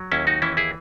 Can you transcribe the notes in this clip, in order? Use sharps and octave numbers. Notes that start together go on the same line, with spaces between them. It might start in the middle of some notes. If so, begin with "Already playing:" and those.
Already playing: F#3
D#2 C#4 E4
D#4 F#4
E3 C#4 E4
E4 G#4